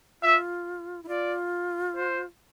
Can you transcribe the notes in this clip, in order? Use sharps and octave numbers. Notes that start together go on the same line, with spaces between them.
F4 E5
E4
F4 D5
C5